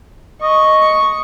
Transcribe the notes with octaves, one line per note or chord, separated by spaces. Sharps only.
D#5 C#6